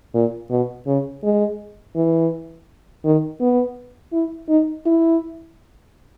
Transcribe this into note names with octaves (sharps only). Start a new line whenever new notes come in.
A#2
B2
C#3
G#3
E3
D#3
B3
E4
D#4
E4